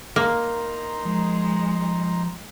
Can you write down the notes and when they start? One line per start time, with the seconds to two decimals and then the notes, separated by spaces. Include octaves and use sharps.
0.16 A#3 D#4 A#5 C6
1.05 F3 G#3